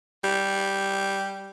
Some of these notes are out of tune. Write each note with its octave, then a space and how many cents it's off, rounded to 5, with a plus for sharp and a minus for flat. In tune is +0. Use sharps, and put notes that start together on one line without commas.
G3 -5